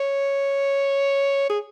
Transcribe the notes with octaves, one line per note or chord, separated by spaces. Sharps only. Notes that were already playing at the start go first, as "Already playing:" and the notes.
Already playing: C#5
G#4